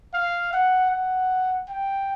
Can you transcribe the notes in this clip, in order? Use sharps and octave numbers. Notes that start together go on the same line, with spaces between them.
F5
F#5
F#5
G5